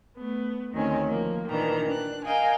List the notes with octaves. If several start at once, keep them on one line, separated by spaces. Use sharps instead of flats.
A3 B3
D2 D#3 C4 C#4 G#5
F3 A#3
A#2 D#3 E3 D4 A#5
D4 F#6
A#4 D#5 F5 G5 G#5